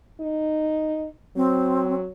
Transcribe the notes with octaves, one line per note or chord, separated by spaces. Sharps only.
D#4
F#3 C4